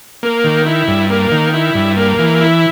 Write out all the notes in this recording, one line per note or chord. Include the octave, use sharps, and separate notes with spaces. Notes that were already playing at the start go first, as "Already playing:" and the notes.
A#3
D#3
E4
G2
A#3
D#3
E4
G2
A#3
E3
E4